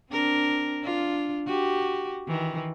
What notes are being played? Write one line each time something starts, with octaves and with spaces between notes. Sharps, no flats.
C4 D4 A#4
D4 F4
F#4 G4
D#3 E3